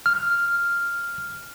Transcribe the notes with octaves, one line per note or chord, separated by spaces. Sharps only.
F6